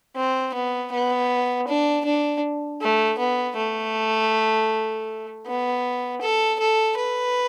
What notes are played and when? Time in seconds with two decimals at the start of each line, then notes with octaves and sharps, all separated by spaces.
0.16 C4
0.54 B3
0.92 B3
1.68 D4
2.05 D4
2.81 A3
3.18 B3
3.57 A3
5.47 B3
6.22 A4
6.59 A4
6.97 B4